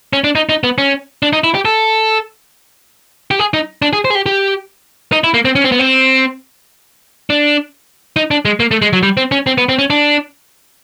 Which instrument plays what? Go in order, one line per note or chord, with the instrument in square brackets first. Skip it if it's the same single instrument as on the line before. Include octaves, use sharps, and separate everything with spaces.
[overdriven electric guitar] C#4
D4
D#4
D#4
B3
C#4
D4
D#4
E4
G4
A4
G4
G#4
D#4
D4
G#4
C5
G#4
G4
G4
D#4
E4
A#3
C4
C#4
C4
B3
C4
D4
D#4
D4
G#3
A#3
A3
G#3
F#3
G3
C4
C#4
C4
B3
C4
C#4
D4